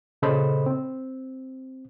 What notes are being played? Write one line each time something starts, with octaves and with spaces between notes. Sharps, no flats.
A#2 C#3 A4 C5 D#5 B5
C4